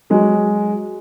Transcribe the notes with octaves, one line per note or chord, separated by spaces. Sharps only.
F#3 G#3